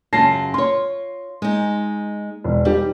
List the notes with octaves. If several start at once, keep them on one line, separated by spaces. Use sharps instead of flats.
F#2 C#3 F4 A5 A#6 C7
F4 C#5 C6
G#3 D#4
E1
G3 D#4 G4